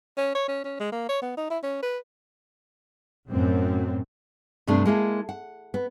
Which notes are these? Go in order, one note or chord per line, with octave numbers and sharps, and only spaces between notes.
C#4
C#5
C#4
C#4
G#3
A#3
C#5
B3
D#4
E4
C#4
B4
F#2 A2 C4
G2 C3 A3 C4 D4
G#3 A#3 E4 A4
F#5
B3